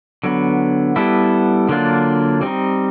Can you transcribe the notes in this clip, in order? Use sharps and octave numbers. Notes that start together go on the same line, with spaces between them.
D3 F#3 B3
G3 B3 E4 A4
D3 F#3 A#3 D4 F4
G3 C4 D#4